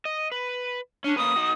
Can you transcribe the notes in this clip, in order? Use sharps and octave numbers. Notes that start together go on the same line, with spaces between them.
D#5
B4
C#4 D4
A#3 C#4 B4 D#6
D#4 F#4